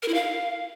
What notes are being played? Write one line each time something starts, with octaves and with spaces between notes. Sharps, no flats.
A#4
E4
F5